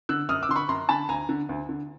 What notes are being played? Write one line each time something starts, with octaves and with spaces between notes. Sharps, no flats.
D3 E6 F#6
F#2 D#6 F6
D6 E6
D3 C6
B5 C#6
F#2 A#5 C6
D3 A5 B5
D2 G#5 A#5
D3
D2
D3